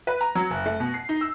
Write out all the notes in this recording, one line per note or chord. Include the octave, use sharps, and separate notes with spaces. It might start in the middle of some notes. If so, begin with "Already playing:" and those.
B4
A#5
F#3
F#1
A3
B2
C7
D#4
E6